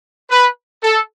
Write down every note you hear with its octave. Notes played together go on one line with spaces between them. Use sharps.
B4
A4